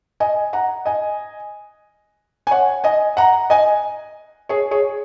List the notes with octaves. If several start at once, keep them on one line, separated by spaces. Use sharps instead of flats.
D#5 G#5
F#5 A#5
D#5 G#5
G#5
C#5 F#5
D#5 G#5
F#5 A#5
D#5 G#5
G#4 C#5
G#4 C#5